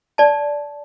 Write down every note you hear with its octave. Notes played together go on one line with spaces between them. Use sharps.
D5 A5